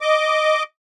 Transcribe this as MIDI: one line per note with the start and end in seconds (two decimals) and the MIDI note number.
0.01 0.63 75
0.01 0.63 86